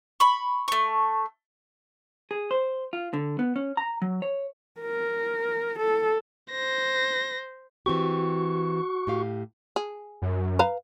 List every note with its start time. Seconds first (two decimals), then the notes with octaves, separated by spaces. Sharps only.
0.20 B5 C#6
0.68 A3 C#6
2.31 G#4
2.51 C5
2.93 F4
3.13 D3
3.39 B3
3.56 C#4
3.77 A#5
4.02 F#3
4.22 C#5
4.80 A#4
5.79 A4
6.51 C5 A#6
7.86 E3 C4 F#4 G4 C#6
9.07 A2 G4 F5
9.76 G#4
10.22 F#2
10.59 B4 F5 A#5